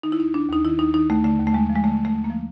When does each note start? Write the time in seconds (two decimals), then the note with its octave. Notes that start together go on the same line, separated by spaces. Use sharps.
0.03 D#3 D#4
0.12 E4
0.19 D#2 D#4
0.34 D#3 D4
0.49 D#2 D#4
0.64 D#3 E4
0.79 D#2 D#4
0.94 D#3 D#4
1.10 D#2 A3
1.24 D3 A3
1.40 D#2
1.47 A3
1.54 D#2 G#3
1.70 F3
1.75 G#3
1.84 D3 A3
2.00 D#2 A3
2.15 D#2
2.24 A#3
2.30 F3